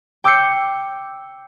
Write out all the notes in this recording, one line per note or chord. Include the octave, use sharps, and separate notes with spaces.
G5 D6 E6 G6 C7 C#7